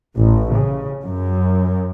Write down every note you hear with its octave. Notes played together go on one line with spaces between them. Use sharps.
A1
C#3
F#2